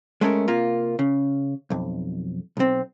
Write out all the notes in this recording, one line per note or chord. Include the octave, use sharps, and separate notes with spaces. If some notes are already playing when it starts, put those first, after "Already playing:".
G#3 A3 C#4 A4 A#4
C3 A#3 F4
C#3
B1 F2
B1 C4